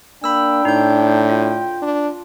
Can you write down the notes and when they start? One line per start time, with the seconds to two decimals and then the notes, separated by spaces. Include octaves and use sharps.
0.24 A#3 D4 G5 B5 E6
0.65 A2 D#4 G6
1.29 F4
1.82 D4